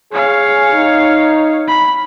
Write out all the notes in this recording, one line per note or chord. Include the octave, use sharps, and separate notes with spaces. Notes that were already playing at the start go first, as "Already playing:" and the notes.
G#4 C#5 F5
D#4
B5